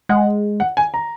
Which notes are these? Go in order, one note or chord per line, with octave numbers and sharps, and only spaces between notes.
G#3 F#5
F#5
G#5
A#5